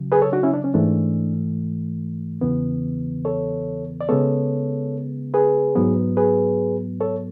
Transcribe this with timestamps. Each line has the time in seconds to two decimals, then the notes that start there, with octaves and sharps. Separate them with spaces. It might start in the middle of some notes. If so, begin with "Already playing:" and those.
Already playing: C#3 F#3
0.12 G#4 B4
0.22 A4 C#5
0.32 D4 F#4
0.43 C#4 E4
0.54 D4
0.64 C#4
0.74 G#2 E3 A3 D4
2.41 E2 C#3 E3 B3
3.25 A4 C#5
4.01 D5
4.09 C#3 G#3 B3 A4 C#5
5.34 G#4 B4
5.75 G#2 F#3 B3
6.17 G#4 B4
7.01 A4 C#5